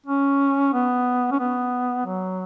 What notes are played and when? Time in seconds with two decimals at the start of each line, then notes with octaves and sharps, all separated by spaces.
0.07 C#4
0.74 B3
1.32 C#4
1.40 B3
2.06 F#3